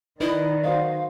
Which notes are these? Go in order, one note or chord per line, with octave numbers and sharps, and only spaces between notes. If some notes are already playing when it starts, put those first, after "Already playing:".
D#3 D#4 E4 B4 D5 D#5
F#4 C5 D#5 F5